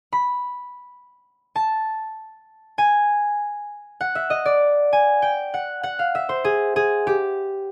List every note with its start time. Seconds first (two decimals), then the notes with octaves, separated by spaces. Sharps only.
0.13 B5
1.56 A5
2.78 G#5
4.01 F#5
4.15 E5
4.30 D#5
4.45 D5
4.93 G#5
5.22 G5
5.54 F#5
5.83 F#5
5.99 F5
6.15 E5
6.29 C5
6.44 G#4
6.76 G#4
7.07 G4